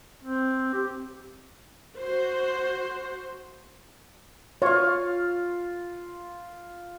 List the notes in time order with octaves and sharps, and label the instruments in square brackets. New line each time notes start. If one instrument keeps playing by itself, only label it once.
[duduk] C4
G4
[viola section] F#4 C5
[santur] F4 F5 [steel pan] C#5